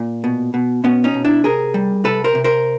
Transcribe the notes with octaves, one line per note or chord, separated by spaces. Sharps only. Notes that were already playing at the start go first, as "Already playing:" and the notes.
Already playing: A#2
B2
B2
B2 B3 C#4
C#4 D#4
B2
D4 E4
C3 G#4 A#4
G3
C3 A4 B4
A#4 C5
C3
A#4 C5